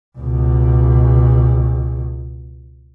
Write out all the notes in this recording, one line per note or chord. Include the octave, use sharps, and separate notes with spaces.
C#2 B2